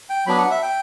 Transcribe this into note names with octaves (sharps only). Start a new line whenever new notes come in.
G5
F#3 B3 D4 B5
F#5
E5
G5